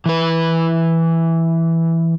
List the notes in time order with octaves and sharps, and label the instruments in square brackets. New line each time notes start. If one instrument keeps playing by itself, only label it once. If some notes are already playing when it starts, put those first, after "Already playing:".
[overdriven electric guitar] E3 B4